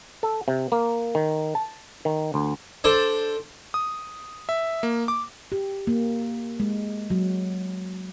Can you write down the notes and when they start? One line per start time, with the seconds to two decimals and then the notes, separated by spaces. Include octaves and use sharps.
0.23 A4
0.48 C3
0.72 A#3
1.15 D#3
1.55 A5
2.05 D#3
2.34 D2
2.84 D4 A4 C5 D5
3.74 D#6
4.49 E5
4.83 A#3
5.08 D6
5.52 G4
5.87 A#3
6.60 G#3
7.10 F#3